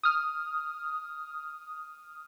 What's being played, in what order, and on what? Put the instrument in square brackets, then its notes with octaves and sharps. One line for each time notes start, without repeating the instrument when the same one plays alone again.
[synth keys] D#6 F6